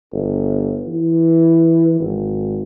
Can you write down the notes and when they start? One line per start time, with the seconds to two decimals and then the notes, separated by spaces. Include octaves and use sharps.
0.12 G1
0.88 E3
2.00 G#1